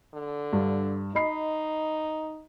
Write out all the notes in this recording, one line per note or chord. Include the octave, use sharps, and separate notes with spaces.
D3
G2
D#4 D#5 B5 C7